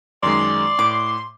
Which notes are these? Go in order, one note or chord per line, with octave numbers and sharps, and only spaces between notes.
F#2 D#3 G#3 D5 C6
A2 D6